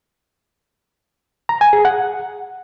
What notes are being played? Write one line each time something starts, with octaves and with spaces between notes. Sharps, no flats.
A#5
G#5
G#4
F#5